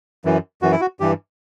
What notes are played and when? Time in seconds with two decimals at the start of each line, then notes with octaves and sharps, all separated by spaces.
0.25 F#2 E3
0.62 F#2 E3 F#4
0.71 E4
0.81 F#4
1.00 G2 E3 G4